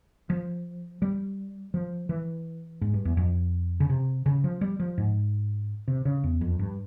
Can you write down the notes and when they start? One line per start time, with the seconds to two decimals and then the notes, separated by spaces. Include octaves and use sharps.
0.30 F3
1.02 G3
1.74 F3
2.09 E3
2.81 G#2
2.94 G2
3.05 E2
3.17 F2
3.80 C#3
3.90 C3
4.26 C#3
4.44 F3
4.61 G3
4.80 F3
4.98 G#2
5.88 C3
6.05 C#3
6.24 E2
6.41 F2
6.59 G2